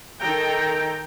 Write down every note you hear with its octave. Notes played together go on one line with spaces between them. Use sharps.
D#3 A4 G5 A#5